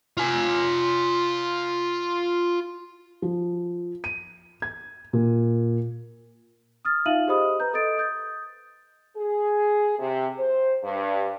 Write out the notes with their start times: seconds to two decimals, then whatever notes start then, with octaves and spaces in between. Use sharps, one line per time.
0.17 F4 G#5
3.22 F3
4.04 D#7
4.62 G#6
5.13 A#2
6.85 D#6 F6 A6
7.06 D#4 F4 E5 F5 D#7 F#7
7.27 G4 G#4 C5 D#5 B5 D#6
7.60 B4 A#5 G6
7.73 A4 D#5 D#6 G6 A6 D7
7.98 D#6 G6 A6
9.17 G#4
9.99 C3
10.38 C5
10.83 G2